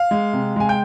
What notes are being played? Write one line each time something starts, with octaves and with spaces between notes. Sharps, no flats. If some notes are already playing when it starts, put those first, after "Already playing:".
Already playing: F5
G#3
C3
G#3 G#5
G5